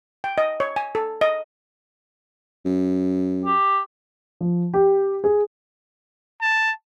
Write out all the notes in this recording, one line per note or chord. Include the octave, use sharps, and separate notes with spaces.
G5
D#5
C#5
G#5
A4
D#5
F#2
G4
F3
G4
G#4
A5